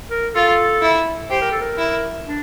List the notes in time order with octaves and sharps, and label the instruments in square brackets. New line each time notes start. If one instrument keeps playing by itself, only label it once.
[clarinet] A#4
[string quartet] F4 [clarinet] A4
[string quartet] E4
[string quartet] G4 [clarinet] C5
[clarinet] A#4
A4
A#4
[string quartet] E4
[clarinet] D4